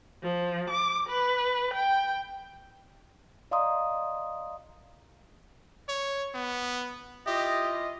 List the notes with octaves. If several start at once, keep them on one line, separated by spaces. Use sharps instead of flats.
F3
D6
B4
G5
D5 D#5 F5 A#5 C6 D#6
C#5
B3
E4 F4 G4 D#5